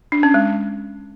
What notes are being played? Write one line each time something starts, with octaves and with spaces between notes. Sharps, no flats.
D4
C#4
G#3